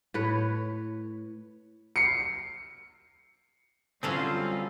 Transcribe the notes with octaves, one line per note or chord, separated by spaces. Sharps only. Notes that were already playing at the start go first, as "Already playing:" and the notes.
A2 B4 C#5
C7 C#7
D3 F#3 G3 C4 C#4 F4 G#4 A4